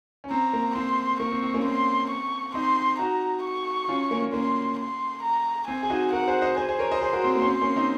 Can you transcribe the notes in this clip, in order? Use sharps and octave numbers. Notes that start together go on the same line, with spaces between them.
C#4
C4 A#5
A#3
C4 C6
A#3 C#6
C4
C4
A#3 C#4
C4 C6
C#6
C4 D#4 C6
D#4 F#4 A#5
C#6
C#4 F4
A#3 C#4
A#3
A#3 C#4 C6
C6
A#5
C4 G#5
G#4
D#4 F#4
F#4 A#4 F#5
G#4 C5
C5 D#5
G#4 C5 G#5
G#4 C5
A#4 C#5
C5 D#5
G#4 C5 C6
F#4 A#4
C4
A#3
C#4
C4
A#3 C#4
C4 D#4